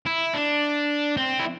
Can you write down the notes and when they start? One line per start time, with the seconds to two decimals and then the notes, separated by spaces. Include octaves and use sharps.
0.06 E4
0.34 D4
1.17 C4
1.39 E4